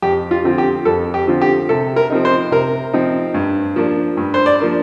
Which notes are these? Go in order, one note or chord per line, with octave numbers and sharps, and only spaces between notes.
F2 G4
F4
D3 F3 C4 F4
G4
F2 A4
G4
D3 F3 C4 F4
G4
C3 A4
A#4
F3 C4 D#4
C5
C3 A#4
F3 C4 D#4
G2
F3 A#3 D4
G2
C5
D5
F3 A#3 D4